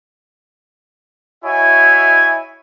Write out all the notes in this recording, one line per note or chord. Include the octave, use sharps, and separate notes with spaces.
E4 F#4 C#5 D#5 E5 G#5